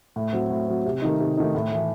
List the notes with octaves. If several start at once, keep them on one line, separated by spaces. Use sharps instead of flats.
A2
F#3 C4
A2
F#3 C4
C3
D#3 A3 D#4
C3
D#3 A3 D#4
A2
E3 A3